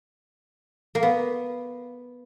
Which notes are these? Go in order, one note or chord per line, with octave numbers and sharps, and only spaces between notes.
A#3
B3